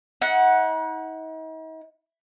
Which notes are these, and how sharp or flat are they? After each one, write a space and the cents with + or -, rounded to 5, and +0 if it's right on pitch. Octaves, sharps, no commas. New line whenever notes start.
D#4 +45 F#5 +0